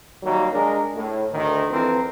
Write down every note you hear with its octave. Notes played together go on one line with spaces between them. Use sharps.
D#3 F#3 G3 A#3
G#3 D4 A#4
A2
D2 D#3
F2 E3 C4 A#4